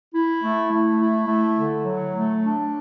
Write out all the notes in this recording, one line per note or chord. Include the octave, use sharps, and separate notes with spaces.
E4
A3
A3
E4
A3
D3
F#3
A3
D4